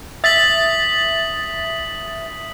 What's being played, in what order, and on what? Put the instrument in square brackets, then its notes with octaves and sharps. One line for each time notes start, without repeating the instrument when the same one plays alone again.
[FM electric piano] E5 A6 [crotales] D#6 B6 F#7